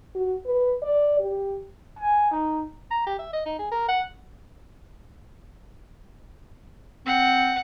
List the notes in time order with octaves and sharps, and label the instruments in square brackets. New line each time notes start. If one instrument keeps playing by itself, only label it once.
[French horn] F#4
B4
D5
G4
[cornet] G#5
D#4
[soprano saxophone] A#5
G4
E5
D#5
D#4
G#4
A#4
F#5
[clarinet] C4 [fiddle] F#5